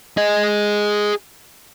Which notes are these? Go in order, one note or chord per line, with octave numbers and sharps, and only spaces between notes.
G#4 D#5